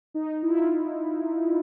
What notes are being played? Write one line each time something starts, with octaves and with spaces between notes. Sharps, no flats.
D#4
E4
F4